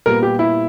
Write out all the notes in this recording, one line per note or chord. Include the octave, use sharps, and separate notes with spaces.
A#2 G3 B3 A#4
G4
E4